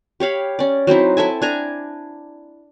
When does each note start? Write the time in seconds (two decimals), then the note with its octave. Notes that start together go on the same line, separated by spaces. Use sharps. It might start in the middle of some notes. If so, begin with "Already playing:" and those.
0.20 G4 C#5 F5 B5
0.59 C#4 D5
0.87 F#3 C4 D#4 E4
1.17 E4 A4 E5 G#5
1.42 D4 G#5 A#5